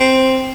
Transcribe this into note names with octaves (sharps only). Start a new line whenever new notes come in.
C4